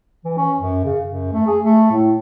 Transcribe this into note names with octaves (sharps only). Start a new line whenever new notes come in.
E3
C#4
F#2
C#3
F#2
A3
G#4
A3
A2